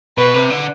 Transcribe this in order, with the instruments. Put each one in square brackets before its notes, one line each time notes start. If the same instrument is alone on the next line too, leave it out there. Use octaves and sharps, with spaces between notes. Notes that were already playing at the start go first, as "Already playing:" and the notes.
[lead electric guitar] B2 [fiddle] B4
[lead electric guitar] C3
D3